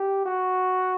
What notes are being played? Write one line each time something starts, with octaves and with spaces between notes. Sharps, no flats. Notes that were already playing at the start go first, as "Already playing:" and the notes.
Already playing: G4
F#4